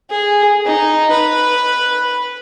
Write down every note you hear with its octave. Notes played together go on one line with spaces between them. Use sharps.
G#4
D#4
B4